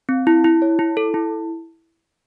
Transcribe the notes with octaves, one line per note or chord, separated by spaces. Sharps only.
C4
E4
E4
C#5
E4
A4
E4